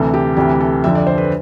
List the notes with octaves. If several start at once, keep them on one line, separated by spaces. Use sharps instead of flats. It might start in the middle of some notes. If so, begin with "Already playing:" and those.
Already playing: D2 C3 E3 A4
G4
D2 C3 E3 G4
A4
F2 D3 F3 E5
D5
C5
B4